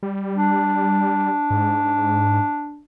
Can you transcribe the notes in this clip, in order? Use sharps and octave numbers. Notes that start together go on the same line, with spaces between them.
G3
D4
G#2